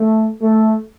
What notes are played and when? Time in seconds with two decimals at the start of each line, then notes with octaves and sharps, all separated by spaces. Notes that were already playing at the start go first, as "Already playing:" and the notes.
Already playing: A3
0.41 A3